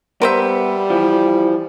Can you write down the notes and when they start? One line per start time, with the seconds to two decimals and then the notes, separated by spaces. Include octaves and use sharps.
0.22 G3 B3 A#4 C5 E5
0.90 E3 F3